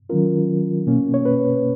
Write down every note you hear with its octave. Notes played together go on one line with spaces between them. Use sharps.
D#3 F#3 C#4 F4 A#4
B2 A#3 C#4
C#5
B4